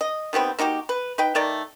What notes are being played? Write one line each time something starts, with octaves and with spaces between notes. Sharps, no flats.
D#5
D#3 G3 B3 C4
A#3 D#4 F#4 G4
B4
D#4 B4 G5
D#3 A3 D5 A#5